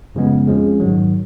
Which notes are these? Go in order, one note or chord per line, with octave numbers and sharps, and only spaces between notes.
F#2 C#3 F3 G#3 B3
F2 F3 G#3 C#4 G#4
G#2 D#3 F#3